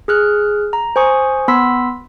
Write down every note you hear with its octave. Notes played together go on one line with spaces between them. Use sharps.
G#4 F6 F#6
A#5
C5 G#5 C#6 D#6
B3 B5 C6 E6 B6